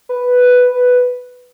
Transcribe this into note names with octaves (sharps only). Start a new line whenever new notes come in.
B4